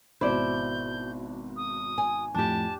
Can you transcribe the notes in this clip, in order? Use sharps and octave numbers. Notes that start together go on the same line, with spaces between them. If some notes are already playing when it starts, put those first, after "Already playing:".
G#1 B2 E4 C5 D5 G6
D#6
G#5
F2 A2 D4 G4 A5